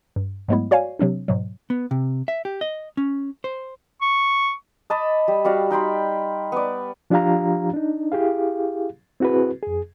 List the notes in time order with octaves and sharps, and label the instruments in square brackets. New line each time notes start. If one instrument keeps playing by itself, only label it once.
[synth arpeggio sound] G2
G#2 F#3 G#3 A3 B3 E4
F#4 C#5 D5 F5 G#5
C3 F#3 C4 D4
G#2 B2 F#3
[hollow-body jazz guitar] B3
C3
E5
G4
D#5
C#4
C5
[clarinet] C#6
[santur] D#5 A5 B5 D6
G3
G3 F#4 D5 F5
D#4 G5 B5 C6
B3 D5
[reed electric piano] F3 D4 F4 G4 F5 A#5
D4 D#4
E4 G4 G#4 F5
C4 E4 F#4 G#4 B4
F2 G#4